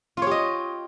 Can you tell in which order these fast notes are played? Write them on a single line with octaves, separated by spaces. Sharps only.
F4 C#5 G4 D#5